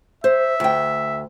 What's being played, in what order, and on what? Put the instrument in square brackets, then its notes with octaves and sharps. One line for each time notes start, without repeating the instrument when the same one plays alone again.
[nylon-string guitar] C5 [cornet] E5
[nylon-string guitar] D2 G5